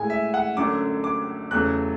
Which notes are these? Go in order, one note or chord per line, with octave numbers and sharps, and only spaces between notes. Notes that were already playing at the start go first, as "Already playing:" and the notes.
Already playing: A2 G#3 G#5
E5
F#5
F#2 D3 F#3 A3 D6
D6
E2 C#3 F#3 A3 F#6